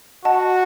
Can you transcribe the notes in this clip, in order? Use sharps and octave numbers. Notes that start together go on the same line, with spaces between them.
F#4 D#5 F#5 A5